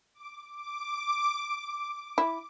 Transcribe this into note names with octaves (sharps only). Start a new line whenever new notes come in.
D6
D6
E4